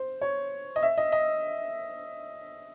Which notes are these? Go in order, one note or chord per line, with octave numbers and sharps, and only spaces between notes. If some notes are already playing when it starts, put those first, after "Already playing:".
Already playing: C5
C#5
D#5
E5
D#5
D#5